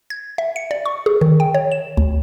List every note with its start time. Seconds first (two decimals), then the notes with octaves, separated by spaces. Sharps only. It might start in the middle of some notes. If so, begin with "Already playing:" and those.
0.10 G#6
0.38 E5
0.56 C#7
0.71 D5
0.86 C#6
1.06 G#4
1.21 D#3
1.40 G5
1.55 C#5
1.72 E7
1.97 D2